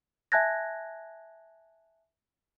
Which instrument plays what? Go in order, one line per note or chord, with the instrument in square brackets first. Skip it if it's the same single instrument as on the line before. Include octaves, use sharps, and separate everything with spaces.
[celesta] E5 G#5 A5 F#6 G#6 A#6